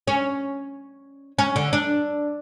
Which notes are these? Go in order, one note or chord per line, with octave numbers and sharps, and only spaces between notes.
C#4
C#4
D3
D4